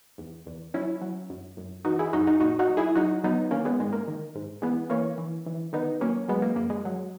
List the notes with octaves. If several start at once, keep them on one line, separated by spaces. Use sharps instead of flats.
E2
E2
F#3 C#4 E4
F#3
F#2
F#2
E3 D#4 F#4
E4 G#4
F#2 D#4 F#4
D#4 F#4
A#2 D#4 F#4
D#4 F#4
F#3
E4 G#4
F#3 D#4 F#4
F#3 B3 D#4
D#3 A#3 C#4
G#3 B3
G#2 G#3
A#3
D#3
G#2
E3 G#3 B3
E3 A#3 C#4
E3
E3
D#3 B3 D#4
F#3 A#3 C#4
F#3 G#3 B3
A#3
F#2 A#3
G#3
F#3